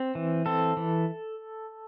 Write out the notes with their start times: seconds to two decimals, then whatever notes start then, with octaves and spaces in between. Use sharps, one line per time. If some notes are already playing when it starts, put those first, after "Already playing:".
Already playing: C4
0.15 E3
0.46 C4 A4
0.77 E3